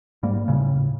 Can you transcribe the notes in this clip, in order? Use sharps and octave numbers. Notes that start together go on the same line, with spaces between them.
G#2 G3 A#3
D#1 B1 A2 C#3